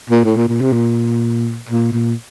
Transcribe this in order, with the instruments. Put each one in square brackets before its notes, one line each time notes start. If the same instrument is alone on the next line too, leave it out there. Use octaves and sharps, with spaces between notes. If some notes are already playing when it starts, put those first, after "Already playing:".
[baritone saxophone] A#2
A2
A#2
A#2
C3
A#2
A#2
A#2